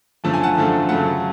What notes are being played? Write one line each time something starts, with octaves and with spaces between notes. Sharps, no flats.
F#2 D3 F3 A3 A5
G#5
F#5 A5
F#2 D3 F3 A3
F#2 C#3 F#3 A3 F#5 A5